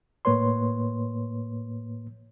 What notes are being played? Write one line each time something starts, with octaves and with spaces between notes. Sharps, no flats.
A2 A#3 B4 C#5 C6